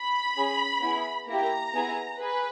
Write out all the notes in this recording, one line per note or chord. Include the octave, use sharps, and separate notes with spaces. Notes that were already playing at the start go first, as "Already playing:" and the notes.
Already playing: B5
C#4 G#4
B3 E4 G#4
A#3 E4 G4 A#5
B3 E4 G#4
G#4 B4